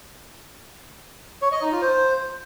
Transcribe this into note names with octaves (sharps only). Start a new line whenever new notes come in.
C#5
D#5
D#4
F4
C5